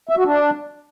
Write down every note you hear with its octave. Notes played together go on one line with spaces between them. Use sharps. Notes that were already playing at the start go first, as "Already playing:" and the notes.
E5
F#4
D4